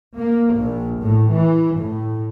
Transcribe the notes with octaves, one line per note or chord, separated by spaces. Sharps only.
A#3
A#1
A2
E3
A2